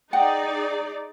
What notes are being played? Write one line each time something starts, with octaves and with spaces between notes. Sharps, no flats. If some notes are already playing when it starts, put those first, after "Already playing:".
D#4 G#4 D5 F#5 G5